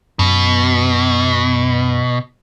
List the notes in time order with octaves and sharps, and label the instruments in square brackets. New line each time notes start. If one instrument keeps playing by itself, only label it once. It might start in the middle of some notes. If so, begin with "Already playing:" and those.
[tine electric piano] F#2 [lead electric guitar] B2